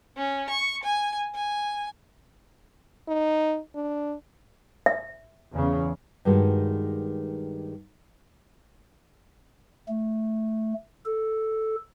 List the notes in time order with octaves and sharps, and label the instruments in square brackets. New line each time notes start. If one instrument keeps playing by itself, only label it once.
[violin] C#4
C#6
G#5
G#5
[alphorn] D#4
D4
[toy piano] E5
[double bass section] E2 C#3
[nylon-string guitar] G2 D#3 G#3 F#4
[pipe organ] A3
A4